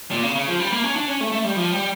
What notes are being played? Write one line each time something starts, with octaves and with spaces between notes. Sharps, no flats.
A#2
C#3
C#3
F3
G3
A#3
C#4
D4
C#4
A3
A3
G3
F3
G3